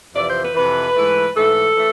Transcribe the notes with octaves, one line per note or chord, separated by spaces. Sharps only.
F2 C3 E3 D5
C5
B4
F2 C3 E3 B4
G#2 E3 A3
G#2 E3 A3 A4
E3 A3